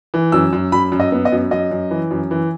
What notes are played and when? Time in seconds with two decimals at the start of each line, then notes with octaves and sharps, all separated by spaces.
0.14 E3
0.32 F#2 E6
0.53 F#2
0.72 F#2 B5
0.92 F#2
1.00 D#5
1.12 B3
1.25 D#5
1.32 F#2
1.51 F#2 D#5
1.71 F#2
1.91 E3
2.11 F#2
2.31 E3